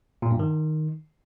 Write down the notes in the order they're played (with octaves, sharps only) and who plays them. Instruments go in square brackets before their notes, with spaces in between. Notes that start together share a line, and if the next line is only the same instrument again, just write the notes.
[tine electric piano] A#2
G2
D#3